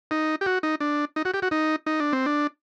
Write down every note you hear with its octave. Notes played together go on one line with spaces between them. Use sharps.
D#4
G4
F#4
D#4
D4
D#4
F#4
G4
F#4
D#4
D#4
D4
C4
D4